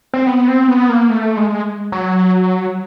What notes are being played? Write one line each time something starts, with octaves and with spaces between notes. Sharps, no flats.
C4
B3
C4
B3
A#3
A3
G#3
F#3